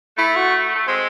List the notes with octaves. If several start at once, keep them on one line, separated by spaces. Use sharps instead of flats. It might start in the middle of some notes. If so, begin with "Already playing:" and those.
A3 E4
F#4
A3
G#3 C4